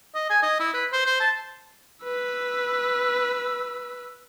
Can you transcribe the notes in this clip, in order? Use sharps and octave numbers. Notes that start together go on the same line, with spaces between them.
D#5
G#5
D#5
E4
B4
C5
C5
A5
B4 E6